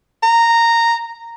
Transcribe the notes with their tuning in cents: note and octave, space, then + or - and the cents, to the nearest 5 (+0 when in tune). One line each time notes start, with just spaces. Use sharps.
A#5 -10